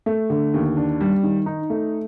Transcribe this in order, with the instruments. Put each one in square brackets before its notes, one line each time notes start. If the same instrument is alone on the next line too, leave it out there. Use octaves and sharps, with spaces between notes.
[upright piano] A3
D3
D#2
D4
G3
D#3
D#4
A3